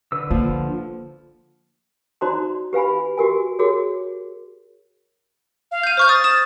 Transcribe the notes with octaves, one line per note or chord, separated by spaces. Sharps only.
D3 B4 E6
F3 A#3
D#4 F#4 C5 D5 A#5 C6
G4 B4 F5 G#5 B5
F#4 G4 A#4 G#5
F#4 G#4 A#4 C#5
F5
G6 D#7
C5 C#6 F6 G6
D#6 A6
D#6 E7